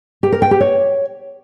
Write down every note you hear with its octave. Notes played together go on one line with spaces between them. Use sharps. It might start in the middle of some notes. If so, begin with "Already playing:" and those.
G4
A#4
G5
G4
C#5